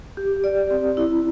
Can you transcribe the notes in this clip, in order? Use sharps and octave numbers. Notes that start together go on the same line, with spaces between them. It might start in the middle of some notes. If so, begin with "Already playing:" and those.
G4
D5
C4
E4